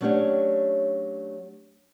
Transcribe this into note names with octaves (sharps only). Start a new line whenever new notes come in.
F#3 A3 C#4 D4 G4 C#5